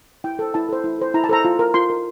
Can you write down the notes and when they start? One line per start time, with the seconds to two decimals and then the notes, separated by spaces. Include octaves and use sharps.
0.24 E4 G5
0.39 A4 C5
0.54 E4 A5
0.69 A4 C5
0.84 E4
0.99 A4 C5
1.14 E4 A#5
1.24 A5
1.29 A4 C5 A#5
1.45 F4
1.59 A#4
1.74 F4 C6
1.90 A#4